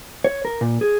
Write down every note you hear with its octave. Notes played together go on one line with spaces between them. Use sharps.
C#5
A#4
A#2
G#4